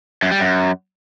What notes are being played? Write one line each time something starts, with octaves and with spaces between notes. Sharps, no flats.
F#2
G3
F#2